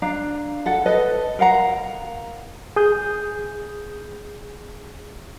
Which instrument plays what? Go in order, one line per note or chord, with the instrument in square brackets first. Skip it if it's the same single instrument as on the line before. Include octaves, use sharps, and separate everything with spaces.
[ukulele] D4 F5 A#5
A4 F#5
A4 B4 D#5
A#4 F5 F#5 A#5
[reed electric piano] G#4 D#6 G6